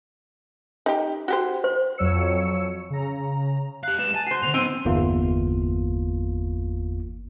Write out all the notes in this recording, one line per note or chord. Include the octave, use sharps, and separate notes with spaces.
D#4 G4
F#4 G4 C5
C5
F2 F#3 C#5 E6 C#7
C#3 A#5
G4 F5 F#6
G#3 B4 E7
G#5 A5
F#4 C5 C7
A#2 D3 F7
B3 C4 D#4 D#7
G1 E2 A#3 F4